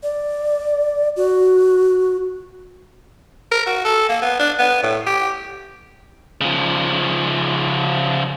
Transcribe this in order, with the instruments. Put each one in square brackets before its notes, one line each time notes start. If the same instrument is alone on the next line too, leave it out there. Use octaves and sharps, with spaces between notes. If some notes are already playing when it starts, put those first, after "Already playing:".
[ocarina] D5
F#4
[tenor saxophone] A#4
F#4
A4
A#3
B3
D4
B3
A2
G4
[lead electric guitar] C#3 F3